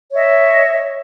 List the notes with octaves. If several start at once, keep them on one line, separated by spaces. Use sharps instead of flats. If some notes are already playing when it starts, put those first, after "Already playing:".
C#5 D#5 E5